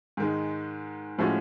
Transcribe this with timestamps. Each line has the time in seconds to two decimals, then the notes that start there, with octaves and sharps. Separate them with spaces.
0.17 G#2 D#3 G#3
1.18 A2 F3 G#3 C#4 F#4